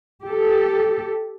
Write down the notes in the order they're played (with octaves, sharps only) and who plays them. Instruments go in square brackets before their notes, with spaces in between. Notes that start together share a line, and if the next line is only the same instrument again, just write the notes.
[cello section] G4 A4